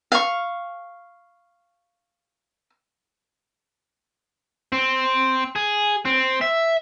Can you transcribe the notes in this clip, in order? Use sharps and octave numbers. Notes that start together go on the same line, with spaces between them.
F5 C#6
C4
G#4
C4
E5